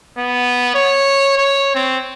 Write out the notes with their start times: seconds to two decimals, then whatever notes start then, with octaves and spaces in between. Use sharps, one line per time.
0.18 B3
0.74 C#5
1.37 C#5
1.75 C4